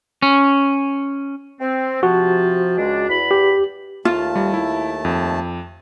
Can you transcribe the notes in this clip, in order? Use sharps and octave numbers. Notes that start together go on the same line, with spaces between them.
C#4
C4
C3 F3 F#4 A5
C#2 G#3 D4
E2 B5
G4
D#2 A3 F4 A5
G3
E4
F2